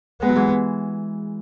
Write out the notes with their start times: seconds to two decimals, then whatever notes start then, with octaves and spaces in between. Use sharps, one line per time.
0.22 G#3 B3
0.29 F#3
0.36 E3 G#3